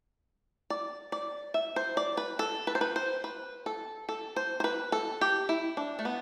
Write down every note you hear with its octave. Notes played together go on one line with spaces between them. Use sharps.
D5
D5
E5
C5
D5
B4
A4
B4
C5
B4
C5
B4
A4
A4
C5
C5
B4
A4
G4
E4
D4
A3
B3